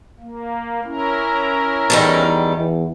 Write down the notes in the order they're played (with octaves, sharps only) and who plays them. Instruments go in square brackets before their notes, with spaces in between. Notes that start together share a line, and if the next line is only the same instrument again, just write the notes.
[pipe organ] A#3
C#4 E4 A#4
[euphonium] E2 [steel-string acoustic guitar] D#3 G3 A4
[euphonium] E2